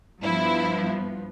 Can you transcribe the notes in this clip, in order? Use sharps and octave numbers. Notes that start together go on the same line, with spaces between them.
G2 F3 B3 E4